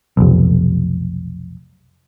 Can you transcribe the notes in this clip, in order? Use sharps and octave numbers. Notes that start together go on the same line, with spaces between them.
F1 B1